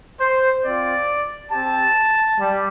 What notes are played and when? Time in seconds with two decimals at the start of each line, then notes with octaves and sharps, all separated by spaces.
0.20 C5
0.64 C4 F4 D5
1.51 C4 G4 A5
2.39 G3